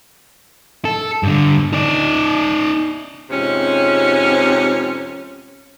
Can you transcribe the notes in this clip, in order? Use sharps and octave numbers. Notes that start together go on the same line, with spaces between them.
A4
G2 D3
D#4 D5
F2 G#2 C3 C#4